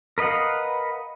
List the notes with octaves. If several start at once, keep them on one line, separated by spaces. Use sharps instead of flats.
A#4 B4 D#5 F5 F#5